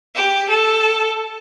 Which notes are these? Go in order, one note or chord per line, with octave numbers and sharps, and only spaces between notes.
G4
A4